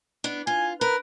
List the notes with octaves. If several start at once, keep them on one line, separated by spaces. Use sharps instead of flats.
B3 D4
F4 G#5
A#4 B4